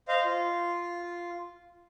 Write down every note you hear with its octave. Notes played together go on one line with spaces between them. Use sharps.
C5 D#5 F5
F4